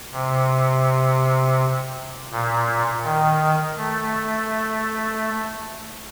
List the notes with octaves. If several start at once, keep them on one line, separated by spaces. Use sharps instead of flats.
C3
A#2
D#3
A3